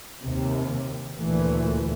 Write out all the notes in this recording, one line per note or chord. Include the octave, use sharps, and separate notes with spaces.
D#2 C3
D2 A#2 E3 A3